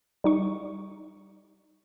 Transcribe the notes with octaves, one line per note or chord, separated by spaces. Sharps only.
G3 D#4 C#6